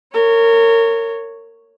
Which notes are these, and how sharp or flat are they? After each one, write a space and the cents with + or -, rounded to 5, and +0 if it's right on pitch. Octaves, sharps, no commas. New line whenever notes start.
A#4 -30 C#5 +0